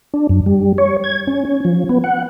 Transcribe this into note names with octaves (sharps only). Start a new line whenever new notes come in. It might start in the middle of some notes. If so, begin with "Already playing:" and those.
D4
F#2
G3
C#5
G#6
C#4
C#4
F3
B3
F#5